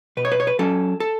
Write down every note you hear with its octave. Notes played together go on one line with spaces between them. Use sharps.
B2 B4
C#5
B4
C#5
B4
F#3 C#4 A4
A4